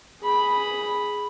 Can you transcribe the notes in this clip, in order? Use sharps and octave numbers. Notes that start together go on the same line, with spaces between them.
G#4 B5